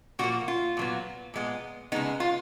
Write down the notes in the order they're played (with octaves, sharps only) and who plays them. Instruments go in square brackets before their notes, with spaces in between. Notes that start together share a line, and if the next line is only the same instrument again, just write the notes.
[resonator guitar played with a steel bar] A#2 F3 A#3 F#4
F4
A#2 F#3 B3
A#2 G#3 B3
C#3 G#3 B3 D#4
F4